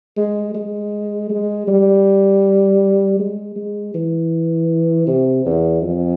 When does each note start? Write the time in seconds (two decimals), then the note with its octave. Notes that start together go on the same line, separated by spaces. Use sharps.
0.17 G#3
0.55 G#3
1.30 G#3
1.68 G3
3.19 G#3
3.56 G#3
3.94 E3
5.07 C3
5.45 E2
5.82 F2